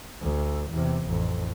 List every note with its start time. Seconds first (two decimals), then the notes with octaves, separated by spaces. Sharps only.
0.22 D2
0.72 E2 C3
1.07 A1 F2